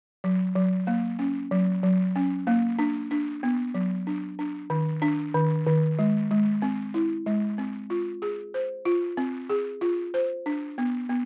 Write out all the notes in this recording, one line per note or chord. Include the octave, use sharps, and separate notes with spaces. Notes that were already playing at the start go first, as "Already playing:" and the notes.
F#3
F#3
A#3
C#4
F#3
F#3
C#4
A#3
D4
D4
B3
F#3
D4
D4
D#3
D4
D#3
D#3
G#3
G#3
C4
E4
G#3
C4
F4
G#4
C5
F4
C4
G#4
F4
C5
D4
B3
B3